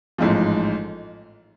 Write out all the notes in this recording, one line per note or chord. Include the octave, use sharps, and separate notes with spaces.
A1 G#2 F3